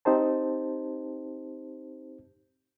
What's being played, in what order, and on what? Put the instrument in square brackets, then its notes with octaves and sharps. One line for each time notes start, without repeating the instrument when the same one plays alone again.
[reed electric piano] C4 D#4 G4 C5 A5